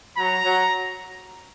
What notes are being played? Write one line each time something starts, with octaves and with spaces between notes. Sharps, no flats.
F#3 A#5
F#3